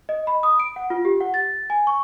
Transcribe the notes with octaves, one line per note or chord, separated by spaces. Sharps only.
D#5
B5
D#6
D7
F#5
F4
G4
F#5
A6
G#5
C#6